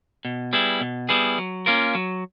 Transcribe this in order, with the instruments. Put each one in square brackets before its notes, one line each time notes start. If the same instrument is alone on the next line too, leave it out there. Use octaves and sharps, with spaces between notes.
[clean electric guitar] B2
G3 B3 E4 G#4
B2
G3 B3 E4 G#4
F#3
A#3 C#4 F4 A#4
F#3